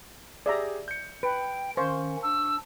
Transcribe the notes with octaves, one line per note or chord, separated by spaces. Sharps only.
G4 G#4 D5 E5 A#5
G6 C#7
B4 G5
D#3 C#4 C5 F5 C#6
D4 E6